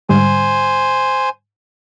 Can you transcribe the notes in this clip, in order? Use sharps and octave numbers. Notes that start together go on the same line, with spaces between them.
G#2 D3 G3 C5 G#5